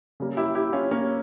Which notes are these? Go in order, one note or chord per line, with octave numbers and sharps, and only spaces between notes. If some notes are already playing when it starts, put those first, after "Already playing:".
C#3 G3 A#3
E4 G4
E4 G4
C#4 F4
A#3 C#4